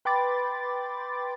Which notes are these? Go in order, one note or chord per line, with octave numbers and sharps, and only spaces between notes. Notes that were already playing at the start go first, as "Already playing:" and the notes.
B4 G5 B5 C6 D6 A6